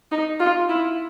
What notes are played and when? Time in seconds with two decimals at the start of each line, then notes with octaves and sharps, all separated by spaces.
0.12 D#4
0.40 F4
0.69 E4